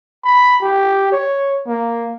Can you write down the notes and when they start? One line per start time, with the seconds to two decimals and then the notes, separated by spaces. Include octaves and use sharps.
0.24 B5
0.62 G4
1.12 C#5
1.67 A#3